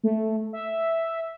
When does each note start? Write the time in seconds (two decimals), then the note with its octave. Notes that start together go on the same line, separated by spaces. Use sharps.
0.04 A3
0.53 E5